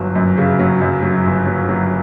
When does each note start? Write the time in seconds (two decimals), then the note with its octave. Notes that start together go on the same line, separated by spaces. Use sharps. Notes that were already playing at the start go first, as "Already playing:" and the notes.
Already playing: G1 F#3
0.15 F#2
0.37 C#3
0.59 F#3
0.81 F#2
1.03 F#3
1.25 G1
1.47 F#3
1.69 F#3